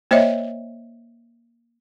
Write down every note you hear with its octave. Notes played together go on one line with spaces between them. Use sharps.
A#3 C5 C#5 D#5 E5